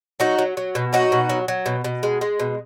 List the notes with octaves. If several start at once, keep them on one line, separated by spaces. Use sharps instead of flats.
F#3 D#4 F#4
F#3
F#3
B2
F#3 D#4 F#4
B2
F#3
F#3
B2
B2
G#3
G#3
B2